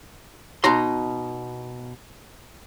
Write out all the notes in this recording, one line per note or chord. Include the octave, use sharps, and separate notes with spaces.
B2 D#4 A#5 C6